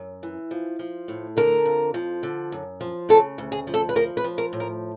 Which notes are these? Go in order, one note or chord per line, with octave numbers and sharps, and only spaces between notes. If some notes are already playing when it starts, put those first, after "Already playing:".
Already playing: F#2
E3
F3
F3
A2
D3 A#4
F2
F3
D3
F#2
F3
C#3 A4
D2
G#4
F3
A4
B4
F3 A#4
B4
F3
A#4
A2
A#4